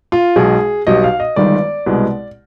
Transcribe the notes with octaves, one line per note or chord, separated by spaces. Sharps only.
F4
B1 B2 G#3 G#4
B1 B2 G3 D#5
F5
D#5
G1 G2 D#3 G#3 D5
C2 B2 G#3 B3